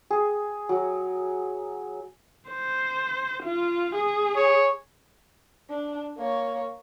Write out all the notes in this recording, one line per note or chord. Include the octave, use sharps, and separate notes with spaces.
G#4
F#3
C5
F4
G#4
C#5
D4
A#3 C#5